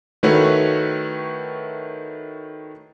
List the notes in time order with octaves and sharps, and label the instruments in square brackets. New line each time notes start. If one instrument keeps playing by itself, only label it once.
[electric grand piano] D#3 A3 E4 F#4 B4 C#5